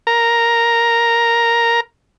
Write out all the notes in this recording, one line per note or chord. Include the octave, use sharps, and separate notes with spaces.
A#4 A#5